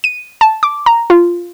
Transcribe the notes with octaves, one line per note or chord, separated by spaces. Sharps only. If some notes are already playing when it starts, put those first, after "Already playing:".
D#7
A5
D6
A#5
F4